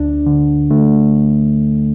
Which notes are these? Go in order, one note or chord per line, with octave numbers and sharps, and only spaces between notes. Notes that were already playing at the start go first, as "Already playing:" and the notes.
Already playing: D2 D4
D3
D3 A3